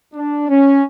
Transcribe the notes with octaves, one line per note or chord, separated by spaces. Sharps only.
D4
C#4